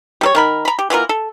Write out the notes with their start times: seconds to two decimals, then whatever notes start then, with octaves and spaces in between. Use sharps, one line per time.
0.21 G3 A4 C#5
0.35 D#3 A#4 B5
0.65 A#5 B5
0.79 G4
0.90 E3 B3 F4 A#4
1.09 A4